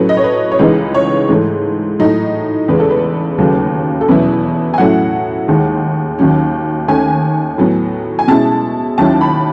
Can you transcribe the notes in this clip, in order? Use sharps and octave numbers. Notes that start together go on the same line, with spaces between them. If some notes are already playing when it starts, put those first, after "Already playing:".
Already playing: A2 F#3 A3 C#4 B4
D#5
C#5
B4
C#5
C#2 C#3 E3 G#3 D#4 B4
C#5
G#2 E3 A3
A2 F#3 A3 D#4
E2 C#3 G#3 B4
A4
B4
D#2 C#3 F#3 A3
A4
E2 B2 F#3 C#4 E4 B4
G#5
A2 F#3 A3 C#4 E4 F#5
D#2 D#3 G#3
D#2 D#3 F#3 C#4
D#2 D#3 A3 C#4 G#5
A2 F#3 B3
G#5
B2 G#3 C#4 E4 A5
D#2 D#3 F#3 C#4 E4 A5
B5